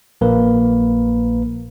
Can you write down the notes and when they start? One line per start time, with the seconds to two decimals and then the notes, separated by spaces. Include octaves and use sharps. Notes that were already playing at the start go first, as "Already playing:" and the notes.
0.21 A#1 A#3 A#4 B4